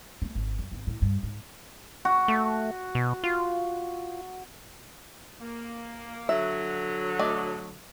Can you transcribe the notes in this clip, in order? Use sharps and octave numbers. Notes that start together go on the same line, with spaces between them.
A3
G#1
F#2
G#1
A2
G2
G#2
F#4
A3
B2
F4
A#3
D3 F#3 E5
A3 D5 D#5